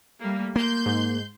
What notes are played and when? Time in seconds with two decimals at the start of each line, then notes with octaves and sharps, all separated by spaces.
0.19 G3 A3 A#3
0.56 A#3 C6 G6
0.86 G#2